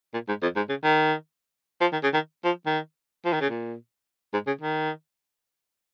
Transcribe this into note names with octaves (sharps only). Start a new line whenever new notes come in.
A#2
G#2
F2
G#2
C#3
D#3
F3
D#3
C#3
D#3
F3
D#3
F3
D#3
C#3
A#2
G#2
C#3
D#3